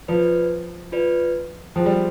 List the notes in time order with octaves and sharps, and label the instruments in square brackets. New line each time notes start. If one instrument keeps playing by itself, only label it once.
[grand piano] F3 [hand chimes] F4 B4 D5
[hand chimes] F4 B4 D5
[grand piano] F3 [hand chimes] G#4 C5 G5
[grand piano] G3